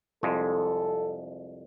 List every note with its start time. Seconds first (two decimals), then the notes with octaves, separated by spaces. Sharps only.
0.23 C2 F2 G#3 A4